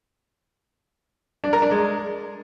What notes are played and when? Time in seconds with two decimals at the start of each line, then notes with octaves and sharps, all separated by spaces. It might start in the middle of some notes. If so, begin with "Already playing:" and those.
1.44 D4
1.53 A#4
1.62 D4
1.71 G#3